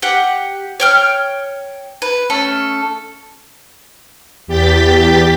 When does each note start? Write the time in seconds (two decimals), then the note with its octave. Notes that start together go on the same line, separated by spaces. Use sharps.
0.02 G4 F#5
0.80 C#5 G5 F6
2.02 B4
2.30 A3 C#4 A4
4.47 E2 G4 G6 A6 B6